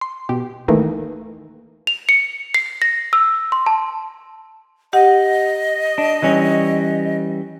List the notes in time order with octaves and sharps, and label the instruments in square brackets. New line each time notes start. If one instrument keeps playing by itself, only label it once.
[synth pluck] C6
B2 G4
D#3 E3 A3 A#3 D#4
[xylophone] F7
C#7
C7
A#6
E6
C6
A5
[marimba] G4 F#5 [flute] D#5
[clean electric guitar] D4
E3 G3 C#4